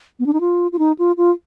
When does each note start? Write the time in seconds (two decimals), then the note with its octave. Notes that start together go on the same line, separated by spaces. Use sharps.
0.19 B3
0.26 D4
0.33 D#4
0.40 F4
0.72 F4
0.79 D#4
0.99 F4
1.17 F4